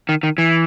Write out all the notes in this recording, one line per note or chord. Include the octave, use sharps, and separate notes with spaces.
D#3
D#3
E3